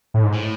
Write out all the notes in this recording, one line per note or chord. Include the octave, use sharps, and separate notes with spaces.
A2
G#2
A2